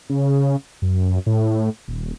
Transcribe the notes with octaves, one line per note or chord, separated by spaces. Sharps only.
C#3
F#2
A2
D#1